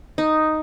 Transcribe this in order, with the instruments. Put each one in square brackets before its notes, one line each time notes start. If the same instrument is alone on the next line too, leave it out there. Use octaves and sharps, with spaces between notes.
[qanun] D#4